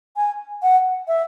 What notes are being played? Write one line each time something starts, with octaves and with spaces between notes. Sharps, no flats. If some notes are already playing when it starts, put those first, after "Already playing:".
G#5
F#5
E5